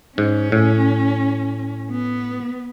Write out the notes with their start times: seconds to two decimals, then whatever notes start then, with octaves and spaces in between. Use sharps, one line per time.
0.18 G#2 C#4
0.52 A2
1.91 B3